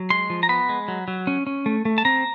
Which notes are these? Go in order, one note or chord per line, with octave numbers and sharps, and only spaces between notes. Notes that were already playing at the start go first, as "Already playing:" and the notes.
Already playing: F#3
G#3 C6
F3
A#5
B3 B5
G#3
F#3
F#3
C#4
C#4
A3
A3
A5
C4 A#5